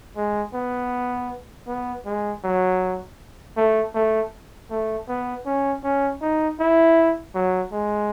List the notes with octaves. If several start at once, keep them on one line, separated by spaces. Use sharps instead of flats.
G#3
B3
B3
G#3
F#3
A3
A3
A3
B3
C#4
C#4
D#4
E4
F#3
G#3